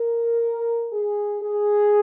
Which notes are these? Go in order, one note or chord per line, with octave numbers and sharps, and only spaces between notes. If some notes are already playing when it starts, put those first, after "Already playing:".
Already playing: A#4
G#4
G#4